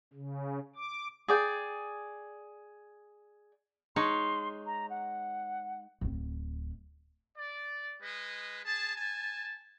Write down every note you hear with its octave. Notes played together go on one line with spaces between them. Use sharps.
C#3
D6
G#4 D5 G5
G#3 D#4 C#5 C6
A#5
F#5
D1 C4
D5
G#3 B4 D#5
G#4 A5
G#5 A5